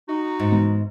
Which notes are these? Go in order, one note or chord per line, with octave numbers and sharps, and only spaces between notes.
D#4 F#4
G#2
E3 G#3 B3